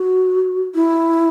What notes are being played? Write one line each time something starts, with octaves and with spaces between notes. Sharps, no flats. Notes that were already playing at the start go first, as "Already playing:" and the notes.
Already playing: F#4
E4